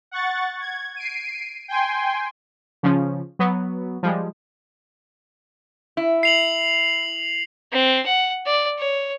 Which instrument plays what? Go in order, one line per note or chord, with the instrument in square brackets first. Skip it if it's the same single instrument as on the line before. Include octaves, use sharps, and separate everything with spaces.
[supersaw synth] F#5 C#6 A6
G#6
C7 D7 D#7
G5 G#5 C6
[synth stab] C#3 F3 C#4
F#3 B3
F3 G3 G#3
[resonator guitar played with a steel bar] E4
[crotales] C7 F7 F#7
[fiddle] C4
F#5
D5
C#5